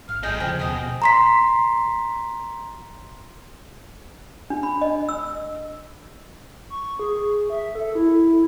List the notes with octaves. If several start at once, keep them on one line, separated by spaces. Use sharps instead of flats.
G#1 F5 F6
A1 G2 G#4 A4 D#5 G6
D#2 C#3 F3 C5 G5
B2 G#4 D#5 D#6
A#5 C6 B6
D4
B5
D#5
E6
C#6
G#4
E5
A4
E4